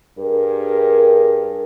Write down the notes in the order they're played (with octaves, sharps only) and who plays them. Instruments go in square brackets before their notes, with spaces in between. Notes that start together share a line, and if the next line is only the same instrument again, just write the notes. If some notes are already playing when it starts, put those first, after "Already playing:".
[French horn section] G2 G#4 A#4